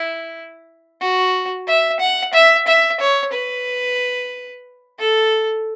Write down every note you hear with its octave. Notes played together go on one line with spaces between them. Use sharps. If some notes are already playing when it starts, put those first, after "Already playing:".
Already playing: E4
F#4
E5
F#5
E5
E5
C#5
B4
A4